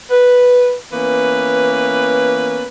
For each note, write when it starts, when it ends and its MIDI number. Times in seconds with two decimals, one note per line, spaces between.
0.10 0.75 71
0.92 2.67 52
0.92 2.67 58
0.92 2.67 59
0.92 2.67 61
0.92 2.67 71